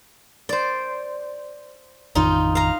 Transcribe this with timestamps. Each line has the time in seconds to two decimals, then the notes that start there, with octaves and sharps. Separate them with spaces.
0.49 C5 D5
2.15 A1 F2 D#3 D#4 F4
2.55 F5 A#5